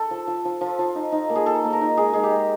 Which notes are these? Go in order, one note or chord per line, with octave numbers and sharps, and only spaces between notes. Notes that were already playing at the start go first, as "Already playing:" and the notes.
Already playing: A4
F3
F3
F3
F3
F3
D#4
D#4
A#3
G#4
A#3 A4
A#3
A#4
D#4
G#3 G#4
G#3 G#4
G4
G#3